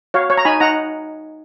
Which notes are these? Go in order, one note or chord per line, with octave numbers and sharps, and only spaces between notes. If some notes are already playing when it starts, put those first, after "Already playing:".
F#4 C#5 F5
C#5
A#5
D#4 G#5 B5
D#4 F#5 A#5